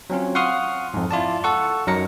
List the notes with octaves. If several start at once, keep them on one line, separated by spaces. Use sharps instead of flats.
F#3 C4 C#4 F4
F5 F#5 C6 C#6 D#6 F6
F2 G#2
E4 F4 D5 A5
A4 F#5 C#6
F#2 F#3 D#4 A#4 A#6 C#7